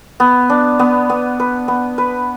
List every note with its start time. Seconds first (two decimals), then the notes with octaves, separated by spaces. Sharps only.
0.20 B3
0.50 D4
0.79 B3
1.10 B3
1.40 B4
1.68 B3
1.98 B4